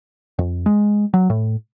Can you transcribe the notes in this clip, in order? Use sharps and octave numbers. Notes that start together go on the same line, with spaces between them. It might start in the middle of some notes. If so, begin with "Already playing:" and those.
F2
G#3
F#3
A2